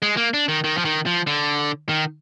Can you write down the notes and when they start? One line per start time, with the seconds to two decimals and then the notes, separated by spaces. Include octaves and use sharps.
0.02 G#3
0.17 A#3
0.34 D4
0.48 D#3
0.64 D#3
0.77 F3
0.85 D#3
1.06 F3
1.27 D3
1.89 D#3